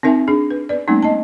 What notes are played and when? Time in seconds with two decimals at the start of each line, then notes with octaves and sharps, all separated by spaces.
0.03 C4 D#4 A#4 E5 G#5
0.28 D4 G#4
0.51 B4
0.69 B3 B4 D5
0.88 G3 A3 A#3 C4 C#4 D#4
1.02 B3 D#5 A5